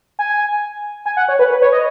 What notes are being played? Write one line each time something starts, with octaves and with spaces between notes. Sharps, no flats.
G#5
G#5
F#5
C#5
B4
B4
C#5
D#5